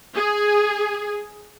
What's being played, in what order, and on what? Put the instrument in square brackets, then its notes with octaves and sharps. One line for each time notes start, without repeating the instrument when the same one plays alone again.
[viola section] G#4